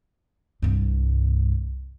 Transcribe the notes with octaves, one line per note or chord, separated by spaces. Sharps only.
C2 G2